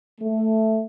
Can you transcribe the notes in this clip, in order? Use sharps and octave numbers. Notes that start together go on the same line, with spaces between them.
A3